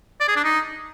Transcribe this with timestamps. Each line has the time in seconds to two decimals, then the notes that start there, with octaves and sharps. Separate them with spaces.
0.20 D5
0.28 G#4
0.36 D4
0.44 D#4